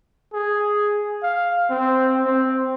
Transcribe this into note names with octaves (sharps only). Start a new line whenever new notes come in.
G#4
F5
C4
C4